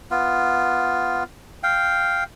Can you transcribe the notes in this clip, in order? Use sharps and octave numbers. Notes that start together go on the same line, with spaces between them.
B3 F4
F5 G5